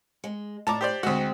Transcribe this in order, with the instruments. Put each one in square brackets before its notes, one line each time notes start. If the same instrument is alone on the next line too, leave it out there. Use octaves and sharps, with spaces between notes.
[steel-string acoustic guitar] G#3
[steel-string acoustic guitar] A2 D4 [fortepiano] A5 A#5 D6
[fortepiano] G4 C5 D5
[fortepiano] D2 F#4 [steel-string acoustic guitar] G#3 C4